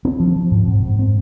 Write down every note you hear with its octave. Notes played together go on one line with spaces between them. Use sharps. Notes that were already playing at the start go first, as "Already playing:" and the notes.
C4
F3
F3
G#2
G#2
G#2
C4